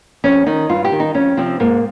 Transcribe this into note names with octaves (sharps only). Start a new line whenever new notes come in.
F2 C#4
D#3 D#4
G2 F4
G4
D#3
D#4
F2 C#4
C3 F3 C4
G#2 A#3